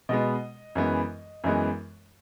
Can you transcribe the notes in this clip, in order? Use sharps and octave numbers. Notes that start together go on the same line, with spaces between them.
B2 G#3 B3 D#5
F#2 E3 G#3 B3
F#2 E3 G#3 B3